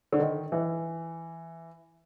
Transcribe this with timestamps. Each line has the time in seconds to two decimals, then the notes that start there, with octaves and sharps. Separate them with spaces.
0.13 D3
0.20 D#3
0.52 E3